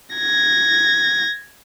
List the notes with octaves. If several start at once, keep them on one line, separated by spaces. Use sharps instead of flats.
G#6 A#6